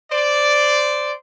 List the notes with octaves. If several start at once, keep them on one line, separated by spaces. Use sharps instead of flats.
C5 D5